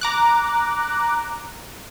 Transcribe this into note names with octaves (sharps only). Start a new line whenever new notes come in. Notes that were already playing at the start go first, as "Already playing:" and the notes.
A#5 D6 F#6